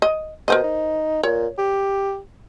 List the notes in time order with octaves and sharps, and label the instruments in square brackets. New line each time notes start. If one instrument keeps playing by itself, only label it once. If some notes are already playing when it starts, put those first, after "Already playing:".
[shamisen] D#5
[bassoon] B2 [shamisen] A#4 C5 D#5
[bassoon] D#4
[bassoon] A#2 [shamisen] C#5
[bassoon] G4